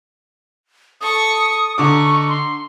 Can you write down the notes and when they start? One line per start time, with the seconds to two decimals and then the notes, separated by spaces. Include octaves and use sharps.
1.01 A4 C#6 D#6
1.78 D3 D#4 C#6 D6
2.28 C6